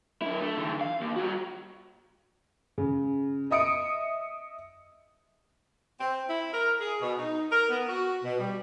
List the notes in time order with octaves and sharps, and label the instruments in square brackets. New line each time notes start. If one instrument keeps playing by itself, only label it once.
[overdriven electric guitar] D3 E4
A3
D3 E3
F5
D#2
G3 F#4
[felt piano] C#3
D#5 E5 D#6 C#7 D7
[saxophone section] C4
E4
A#4
G#4
B2
D#4
A#4
B3
F#4
B2
G3